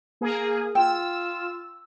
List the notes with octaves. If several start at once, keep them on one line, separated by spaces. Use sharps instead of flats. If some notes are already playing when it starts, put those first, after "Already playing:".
A#3 G#4
F4 G5 E6